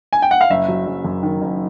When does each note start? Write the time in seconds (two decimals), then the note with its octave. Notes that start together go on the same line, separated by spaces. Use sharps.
0.13 G#5
0.22 G5
0.31 F#5
0.41 F5
0.50 F#1 E5
0.69 F#3
0.87 F#1
1.04 F#2
1.23 D#3
1.41 F#1